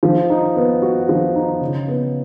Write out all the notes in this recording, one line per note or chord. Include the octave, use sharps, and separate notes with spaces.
F3
D#4
B3
F#4
F3
D#4
C#3
B3